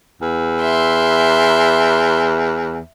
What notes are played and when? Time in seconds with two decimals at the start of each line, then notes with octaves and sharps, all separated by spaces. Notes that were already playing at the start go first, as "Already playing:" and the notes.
0.21 E2
0.61 E5 C6